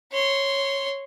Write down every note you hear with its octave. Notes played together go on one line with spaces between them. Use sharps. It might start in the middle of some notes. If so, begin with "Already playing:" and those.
C#5 C6